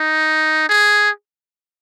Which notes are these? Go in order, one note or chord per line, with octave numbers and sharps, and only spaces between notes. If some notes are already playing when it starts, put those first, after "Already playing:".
Already playing: D#4
G#4